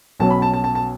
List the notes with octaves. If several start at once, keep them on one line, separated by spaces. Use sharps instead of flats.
B1 B2 F#3 C#4 A5
B5
A5
A5
A5
A5